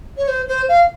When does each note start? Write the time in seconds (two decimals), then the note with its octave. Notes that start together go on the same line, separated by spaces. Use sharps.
0.17 C#5
0.28 C5
0.48 C5
0.69 F5